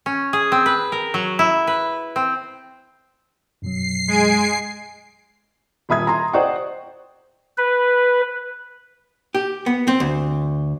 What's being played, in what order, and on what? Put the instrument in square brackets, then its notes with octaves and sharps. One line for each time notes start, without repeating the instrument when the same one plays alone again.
[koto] C#4
G#4
C4
B4
A#4
F#3
E4
B4
C4
[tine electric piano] F#2 B2 F#3 [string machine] C7
[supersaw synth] G#3 G#5 D7
[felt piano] D#1 E5 B5 D#6 G#6
A#5 C6
C5 D5 D#5 F#5 G5 C#6
[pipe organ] B4
[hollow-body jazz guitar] G4
B3
C4
D2